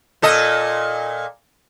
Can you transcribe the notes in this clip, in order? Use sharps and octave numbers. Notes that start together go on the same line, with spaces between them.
A#2 A4 D#5